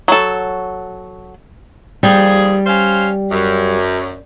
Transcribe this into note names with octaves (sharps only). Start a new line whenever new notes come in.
F#3 A4
D#2 F3 G3 G#4
C#4 C5 F5
F#2